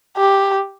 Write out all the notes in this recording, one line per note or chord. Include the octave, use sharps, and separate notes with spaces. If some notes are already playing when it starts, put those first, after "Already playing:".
G4